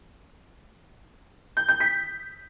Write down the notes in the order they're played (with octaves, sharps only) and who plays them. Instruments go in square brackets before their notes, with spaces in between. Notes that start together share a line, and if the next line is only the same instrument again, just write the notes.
[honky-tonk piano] G6
G6
B6